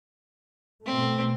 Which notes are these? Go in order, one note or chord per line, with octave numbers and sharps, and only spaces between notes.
B2 A3 C4